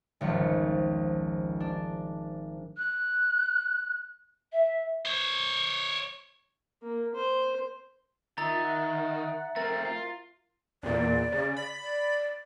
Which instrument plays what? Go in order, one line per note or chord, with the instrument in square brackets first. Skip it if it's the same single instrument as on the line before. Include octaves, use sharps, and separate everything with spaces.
[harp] G#1 C#2 F3 C#7
D4
[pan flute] F#6
E5
[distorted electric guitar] C5 C#5
[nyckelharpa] A#3
C5
[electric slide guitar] D#3 [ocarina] F4 [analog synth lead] E5 [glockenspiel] A#5 A6
[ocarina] E5 [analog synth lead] F#5
[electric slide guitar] A3 C4 [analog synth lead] A#4 [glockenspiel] A6
[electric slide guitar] F4
[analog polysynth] E2 A#2 [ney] D5
[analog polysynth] C#3
B5
[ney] D5